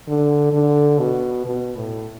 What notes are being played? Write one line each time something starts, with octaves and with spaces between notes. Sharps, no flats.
D3
D3
B2
B2
A2